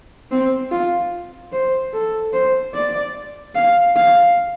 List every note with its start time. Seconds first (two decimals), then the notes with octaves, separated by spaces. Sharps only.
0.31 C4
0.71 F4
1.52 C5
1.93 A4
2.33 C5
2.74 D5
3.55 F5
3.96 F5